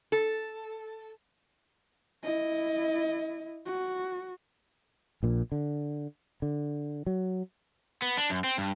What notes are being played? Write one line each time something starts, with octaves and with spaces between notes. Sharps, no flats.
A4
E4 D#5
F#4
A#1 A#2
D3
D3
F#3
B3
D4
F#2
C4
G2